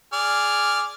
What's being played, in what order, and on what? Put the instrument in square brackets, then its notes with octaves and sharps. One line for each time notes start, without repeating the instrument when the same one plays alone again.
[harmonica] G#4 D5 F6